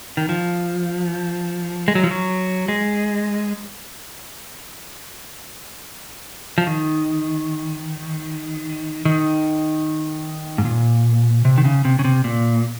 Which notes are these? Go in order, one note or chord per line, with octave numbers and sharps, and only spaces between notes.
D#3
F3
G#3
F#3
F3
F#3
G#3
F3
D#3
D#3
G#2
A#2
C3
D#3
C#3
C3
C#3
C3
A#2